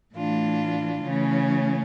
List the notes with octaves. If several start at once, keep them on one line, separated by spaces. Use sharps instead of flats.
A2 E3 A3 D4 F4
C#3 E3 A3 C#4